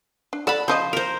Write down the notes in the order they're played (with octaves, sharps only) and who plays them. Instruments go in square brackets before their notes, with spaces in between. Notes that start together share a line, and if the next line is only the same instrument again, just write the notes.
[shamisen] D4
[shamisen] A4 D5 F#5 [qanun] A5 B5
[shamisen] C#3 F3 D#5 [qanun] C5
[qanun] A#4 C5